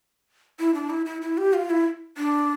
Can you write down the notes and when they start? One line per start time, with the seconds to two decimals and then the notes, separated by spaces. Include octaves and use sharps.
0.59 E4
0.75 D4
0.90 E4
1.06 E4
1.22 E4
1.38 G4
1.53 F4
1.70 E4
2.17 D4